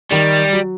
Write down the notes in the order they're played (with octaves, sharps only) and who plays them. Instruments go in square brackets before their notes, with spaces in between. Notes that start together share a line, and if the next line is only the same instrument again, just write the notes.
[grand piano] D#3 [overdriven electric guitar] G3
[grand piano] F#3